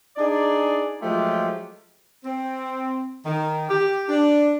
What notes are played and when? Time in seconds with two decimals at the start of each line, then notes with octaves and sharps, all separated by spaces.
0.17 D4 D#4 G#4 D5
1.01 F3 F#3 G#3 A3 F4 G4
2.25 C4
3.25 D#3
3.69 G4
4.09 D4